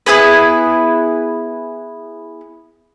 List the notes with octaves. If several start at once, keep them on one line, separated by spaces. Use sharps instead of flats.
B3 E4 G#4 B4